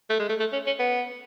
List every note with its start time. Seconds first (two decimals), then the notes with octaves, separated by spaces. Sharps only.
0.10 A3
0.19 G#3
0.29 A3
0.39 A3
0.53 C#4
0.67 C#4
0.79 B3